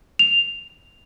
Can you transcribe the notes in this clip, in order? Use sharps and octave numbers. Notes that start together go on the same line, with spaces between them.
F7